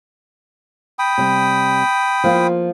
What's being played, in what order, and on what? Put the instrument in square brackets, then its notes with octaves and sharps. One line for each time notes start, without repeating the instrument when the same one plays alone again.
[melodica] G5 B5 D#6
[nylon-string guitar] C3 G3
F3 A#3 F4